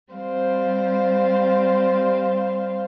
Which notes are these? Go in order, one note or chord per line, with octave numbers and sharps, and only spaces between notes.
G3 C4 C5 F5